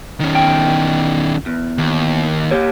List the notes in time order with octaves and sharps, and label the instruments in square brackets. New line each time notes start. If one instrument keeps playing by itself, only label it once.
[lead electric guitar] D#3 C#4
[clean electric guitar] E2 G5
E2
[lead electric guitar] D#2
[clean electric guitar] A#3 G4 C#5